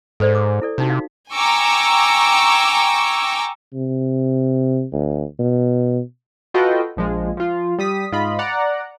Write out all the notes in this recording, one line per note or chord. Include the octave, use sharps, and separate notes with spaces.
G#2 A4 C5 D5
D6
E4 A4 D5
C3 D4 D#4 F#4
D#4 F5
G5 G#5 A#5 C#6 D6 E6
C3
D2
B2
F4 F#4 A4 B4 D#5 G5
A#1 F3 G#3
F3 F4
G3 D#6 B6
G#2 F4 D#5 B5
D5 F#5 A#5